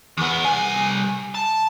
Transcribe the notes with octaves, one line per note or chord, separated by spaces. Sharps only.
E2 B3
C2 G#5
A5